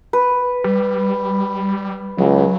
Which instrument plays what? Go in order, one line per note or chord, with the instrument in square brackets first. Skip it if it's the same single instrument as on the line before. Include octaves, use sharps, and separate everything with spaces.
[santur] B4
[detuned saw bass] G3
[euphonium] C#2 [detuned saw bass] F#3